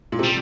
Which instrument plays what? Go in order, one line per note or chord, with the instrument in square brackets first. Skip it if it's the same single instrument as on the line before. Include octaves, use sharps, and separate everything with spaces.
[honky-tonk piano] A#2
C3
[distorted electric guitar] G3